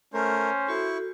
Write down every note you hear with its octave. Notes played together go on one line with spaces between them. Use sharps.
A3 C#4 A#4 C5
E4 F#4 A4 C#6